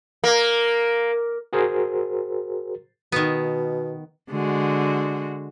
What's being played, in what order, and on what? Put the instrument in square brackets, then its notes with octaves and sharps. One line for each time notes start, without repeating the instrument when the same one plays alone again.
[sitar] A#3
[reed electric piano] F#4 G#4 A#4 C5
[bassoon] B2 [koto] D#3 B3
[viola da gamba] D3 G#3 F#4